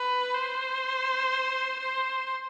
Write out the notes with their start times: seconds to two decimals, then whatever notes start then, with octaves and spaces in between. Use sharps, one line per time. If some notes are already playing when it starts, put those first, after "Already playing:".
Already playing: B4
0.34 C5
1.79 C5